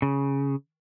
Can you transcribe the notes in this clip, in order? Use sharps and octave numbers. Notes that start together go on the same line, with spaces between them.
C#3